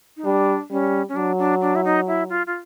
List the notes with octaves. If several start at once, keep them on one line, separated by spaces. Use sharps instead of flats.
D#4
G3 D4
G3 C#4
C#4
F#3 D4
D4
D4
E4
D#4
E4
F4
F4